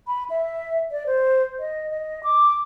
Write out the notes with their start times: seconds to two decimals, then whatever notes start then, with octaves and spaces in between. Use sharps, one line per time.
0.07 B5
0.30 E5
0.91 D5
1.06 C5
1.59 D#5
1.91 D#5
2.24 D6